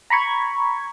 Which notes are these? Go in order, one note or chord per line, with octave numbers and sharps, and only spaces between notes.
A#5 B5 C#6 G#6